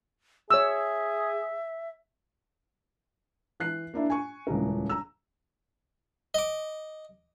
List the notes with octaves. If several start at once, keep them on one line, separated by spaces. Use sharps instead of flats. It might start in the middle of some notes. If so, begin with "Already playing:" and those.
G#4 C#5 E5 E6
E3 F#6 C7
A#3 D4 E4
G#5 C#6
D#1 C#2 E3 A#4
A#5 E6
D#5 D6